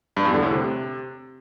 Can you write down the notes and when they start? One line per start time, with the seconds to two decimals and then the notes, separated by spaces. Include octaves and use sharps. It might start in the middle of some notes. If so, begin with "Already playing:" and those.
0.17 G2
0.25 E2
0.34 D3
0.42 A2
0.51 C3